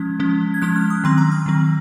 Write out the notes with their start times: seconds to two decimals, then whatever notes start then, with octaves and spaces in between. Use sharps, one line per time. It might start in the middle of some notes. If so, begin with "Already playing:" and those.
Already playing: F3 G#3 C#4 G#6
0.20 F3 G#3 C#4
0.54 G#6
0.62 F3 G#3 C#4 F#6
0.76 F6
0.90 D#6
1.04 D#3 F#3 C4 C6
1.18 A#5
1.31 F6
1.46 D#3 F#3 C4